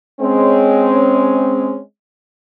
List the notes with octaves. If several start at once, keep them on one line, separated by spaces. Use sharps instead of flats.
G#3 C4 C#4